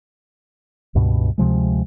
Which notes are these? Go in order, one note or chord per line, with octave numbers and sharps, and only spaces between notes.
C#2 G2 B2
D2 C3 F3 G#3